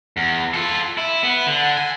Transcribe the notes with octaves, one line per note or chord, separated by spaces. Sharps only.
E2
F4 A4
E4
B3
D3
G#5